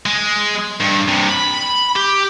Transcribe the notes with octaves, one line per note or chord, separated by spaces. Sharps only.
G#3
G2
G2 C3
B5
G4